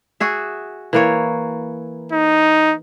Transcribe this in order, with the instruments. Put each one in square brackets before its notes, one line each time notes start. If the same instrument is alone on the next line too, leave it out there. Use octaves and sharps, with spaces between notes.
[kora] F#4 G#4 E5
E3 A#3 C#5
[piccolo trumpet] D#4